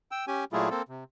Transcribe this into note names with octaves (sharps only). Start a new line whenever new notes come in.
G5 E6
C#4 G4 G#5
A#2 F#3 A3 E4 F4 G#4
A#3 C4 A4
C3